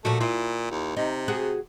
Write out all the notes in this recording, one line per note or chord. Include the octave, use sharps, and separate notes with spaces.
A#2 F3 A3 F#4
A#2 E4 F4
D#2
C3 D#4
F#4 G#4